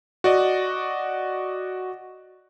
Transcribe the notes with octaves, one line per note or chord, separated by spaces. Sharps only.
F#4 D5 D#5